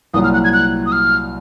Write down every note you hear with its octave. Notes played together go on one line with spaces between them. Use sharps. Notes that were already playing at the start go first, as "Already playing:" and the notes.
C2 A#2 F#3 D#6
F6
F#6
G#6
F#6
D#6
F6